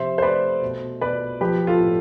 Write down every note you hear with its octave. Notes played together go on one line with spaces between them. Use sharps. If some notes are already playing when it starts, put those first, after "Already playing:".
Already playing: C3 F3 C5 E5
C5
A3 B4 D5
B2
B2 B4 D5
F3 G4 B4
F4 A4
A2